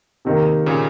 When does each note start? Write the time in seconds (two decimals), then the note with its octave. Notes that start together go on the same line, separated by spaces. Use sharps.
0.25 C3 D#3 A#3
0.66 A#2 C#3